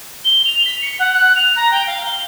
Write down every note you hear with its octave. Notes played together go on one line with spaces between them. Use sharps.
G7
F7
B6
C#7
F#5
F#6
F7
A#5
G5
F5
G7